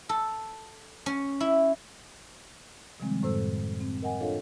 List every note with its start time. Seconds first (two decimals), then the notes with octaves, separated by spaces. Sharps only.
0.09 A4
1.06 C#4
1.40 E4
3.00 C3 D#3 F3 G3 G#3 C4
3.23 F#2 A2 A4 C5 E6
3.81 C4
4.02 A#4 D#5 F#5 G#5
4.20 D4 F4 A4 C#5 D#5 F5